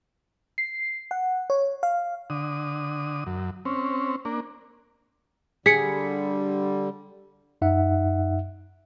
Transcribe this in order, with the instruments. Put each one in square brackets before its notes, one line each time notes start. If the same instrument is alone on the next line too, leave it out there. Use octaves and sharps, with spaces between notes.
[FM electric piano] C7
F#5
C#5
F5
[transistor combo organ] D3 D#6
F#2
C4 C#4
A#3 D4
[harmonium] D3 G3 [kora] G#4 [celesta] B6 C#7
[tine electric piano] F#2 D#4 E5 F#5